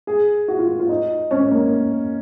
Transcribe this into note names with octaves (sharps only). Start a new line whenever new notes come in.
G#4
F#4
F4
F4
D#4
C#4
A#3